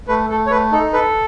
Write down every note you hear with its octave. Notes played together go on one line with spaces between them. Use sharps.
A3 B4
A3 A4
C#5
A3 B4
D#4 A4
A4 B4